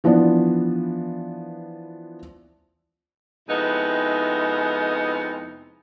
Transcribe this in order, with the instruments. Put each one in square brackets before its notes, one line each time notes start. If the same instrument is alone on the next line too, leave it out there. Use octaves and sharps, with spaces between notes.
[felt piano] E3 F3 B3 D4
[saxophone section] F2 C3 G#3 B3 D#4 E4